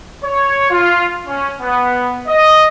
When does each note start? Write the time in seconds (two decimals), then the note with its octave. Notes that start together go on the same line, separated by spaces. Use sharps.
0.23 C#5
0.70 F4
1.28 C#4
1.61 B3
2.27 D#5